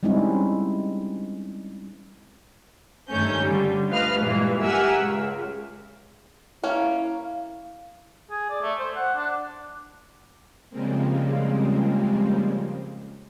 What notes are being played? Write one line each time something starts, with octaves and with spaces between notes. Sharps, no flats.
G3 G#3 C4 C#4 D#4 E4
G2 D#3 A3 C#4 G6
D3 G3
F3 A3 B4 D#5 F5 F6
G2 A#2 E3 G3 G#3 A#3
G4 A#4 E5 F#5 G#5 E6
C#2
A#3 C#4 E4 F5
G#4
D5
A3
C5
F#5
D4
C#3 F3 G3 G#3 A#3 C4